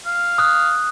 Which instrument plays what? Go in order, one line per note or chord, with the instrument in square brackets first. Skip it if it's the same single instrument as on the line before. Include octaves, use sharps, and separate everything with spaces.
[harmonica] F5
[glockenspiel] D#6 F#6